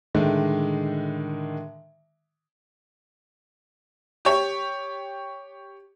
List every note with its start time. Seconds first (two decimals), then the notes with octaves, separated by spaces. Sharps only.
0.14 A2 D3 D#3 G#3
4.25 G4 C#5